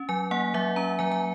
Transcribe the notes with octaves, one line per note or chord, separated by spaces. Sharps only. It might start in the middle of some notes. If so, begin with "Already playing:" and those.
Already playing: C#4
F#3 G#5
A#3 F#5
F#3 E5
C#4 A#5
F#3 G#5
G#5